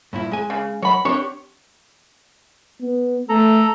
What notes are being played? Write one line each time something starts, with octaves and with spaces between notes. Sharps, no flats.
G2 A#2 E4
G#3 G#5
C#3
F#3 C#5 B5
C4 D4 G4 C#5
B3
A3 A4 A#5